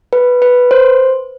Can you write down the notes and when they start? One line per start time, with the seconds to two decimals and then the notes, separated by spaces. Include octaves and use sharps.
0.13 B4
0.42 B4
0.71 C5